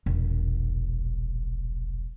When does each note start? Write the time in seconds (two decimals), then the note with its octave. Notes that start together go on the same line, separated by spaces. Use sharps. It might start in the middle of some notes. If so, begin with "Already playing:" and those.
0.06 E1 A#1